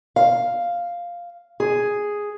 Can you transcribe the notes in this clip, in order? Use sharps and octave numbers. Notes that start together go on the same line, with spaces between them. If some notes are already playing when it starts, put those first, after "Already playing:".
F5
G#4